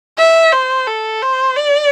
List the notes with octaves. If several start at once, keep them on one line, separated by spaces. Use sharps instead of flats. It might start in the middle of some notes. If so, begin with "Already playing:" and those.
E5
C5
A4
C5
D5